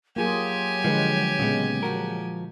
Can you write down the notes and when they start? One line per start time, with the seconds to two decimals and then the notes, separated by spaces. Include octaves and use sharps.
0.16 F#3 A#3 F4 G4 G#4 G#5
0.85 D3 F3 G#3 B4
1.39 A#2 C#3 G#3 B3
1.83 F3 F#4 A#4